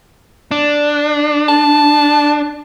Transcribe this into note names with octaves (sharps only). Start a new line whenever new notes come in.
D4
A5